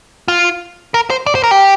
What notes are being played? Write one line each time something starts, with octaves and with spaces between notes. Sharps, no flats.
F4
A#4
C5
D5
C5
A#4
G4